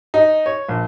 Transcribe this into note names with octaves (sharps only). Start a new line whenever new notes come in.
D#4
C#5
A#1